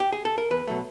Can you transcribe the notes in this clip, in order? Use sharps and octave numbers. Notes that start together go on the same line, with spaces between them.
G4
G#4
A4
A#4
E2 B4
B2 F#3 A3